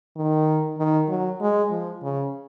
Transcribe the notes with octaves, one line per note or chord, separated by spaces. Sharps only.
D#3
D#3
F#3
G#3
F3
C#3